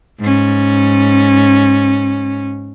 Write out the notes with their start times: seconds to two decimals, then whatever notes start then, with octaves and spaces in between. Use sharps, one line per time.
0.20 G#2 C#4